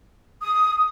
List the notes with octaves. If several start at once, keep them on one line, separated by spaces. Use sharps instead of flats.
D#6